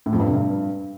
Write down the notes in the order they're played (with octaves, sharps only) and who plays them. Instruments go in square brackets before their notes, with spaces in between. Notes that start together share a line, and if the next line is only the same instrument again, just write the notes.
[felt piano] A2
F2
G2
C3
G2